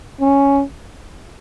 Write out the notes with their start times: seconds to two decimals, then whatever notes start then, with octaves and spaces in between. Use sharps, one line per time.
0.21 C#4